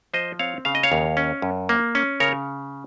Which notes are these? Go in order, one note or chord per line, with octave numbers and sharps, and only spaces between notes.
F3 C5 D#5
C4 C#5 F5
C#3 F5
D#5
C#5 F5
D#2
C#4
F#2
A#3
C#4
C#3 A#4 C#5